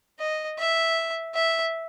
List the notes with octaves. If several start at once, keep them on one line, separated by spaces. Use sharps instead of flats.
D#5
E5
E5